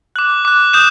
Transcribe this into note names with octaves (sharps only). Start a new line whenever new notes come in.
D6 F#6 F#7
D6 F#6
D#6 G6 E7